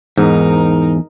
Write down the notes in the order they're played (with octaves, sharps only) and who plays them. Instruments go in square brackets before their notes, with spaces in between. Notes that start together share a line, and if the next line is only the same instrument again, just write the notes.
[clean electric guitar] E2 [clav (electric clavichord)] G#2 [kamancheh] D#4 A#4